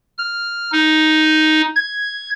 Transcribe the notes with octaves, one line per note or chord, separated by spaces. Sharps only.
F6
D#4
G#6